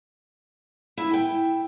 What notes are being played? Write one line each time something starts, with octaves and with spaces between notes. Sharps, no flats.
E4
G5